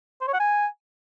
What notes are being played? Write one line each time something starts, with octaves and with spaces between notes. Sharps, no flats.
C5
C#5
F#5
G#5